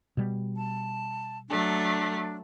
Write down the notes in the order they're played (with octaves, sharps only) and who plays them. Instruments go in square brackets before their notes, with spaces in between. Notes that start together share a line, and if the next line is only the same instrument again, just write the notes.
[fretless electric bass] B2 G3
[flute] A5
[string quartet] F#3 A3 [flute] D4